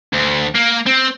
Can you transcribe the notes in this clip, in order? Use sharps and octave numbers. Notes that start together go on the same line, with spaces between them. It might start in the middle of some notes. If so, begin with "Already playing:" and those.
D2
A#3
C4